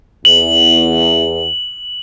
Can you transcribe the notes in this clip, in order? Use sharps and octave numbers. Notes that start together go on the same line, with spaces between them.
E2 F#7